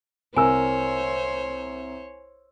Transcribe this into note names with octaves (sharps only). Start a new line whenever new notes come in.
C2 A#4 C5 C#5 G#5 E6